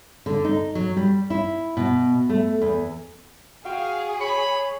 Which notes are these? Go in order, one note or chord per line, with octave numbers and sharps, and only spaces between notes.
D3
D#4
F#3
G3
E4
B2
A3
E2
F#4 G#4 F5 G5
C#5 B5 C#7